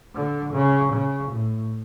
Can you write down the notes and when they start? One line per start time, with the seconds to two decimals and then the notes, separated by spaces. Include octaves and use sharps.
0.15 D3
0.54 C#3
0.93 C#3
1.32 A2